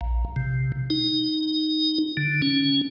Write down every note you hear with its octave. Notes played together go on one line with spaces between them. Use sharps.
A#1
C3
D#4
D3
C#4